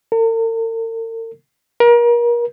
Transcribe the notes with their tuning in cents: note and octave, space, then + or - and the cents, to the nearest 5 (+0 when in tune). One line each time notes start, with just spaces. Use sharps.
A#4 -45
A#4 +35